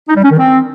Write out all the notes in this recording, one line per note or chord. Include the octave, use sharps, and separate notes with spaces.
D#4
G3
C#4
D#3
C4